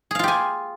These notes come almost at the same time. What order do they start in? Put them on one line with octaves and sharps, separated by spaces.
G#4 F5 F4 G4 G#5